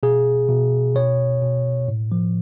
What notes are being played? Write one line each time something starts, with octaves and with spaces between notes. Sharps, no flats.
B2 G#4
B2
B2 C#5
B2
A2
F3